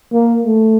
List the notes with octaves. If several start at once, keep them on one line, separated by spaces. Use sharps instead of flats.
A#3
A3